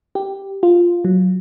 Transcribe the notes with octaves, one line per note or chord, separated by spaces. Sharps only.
G4
F4
F#3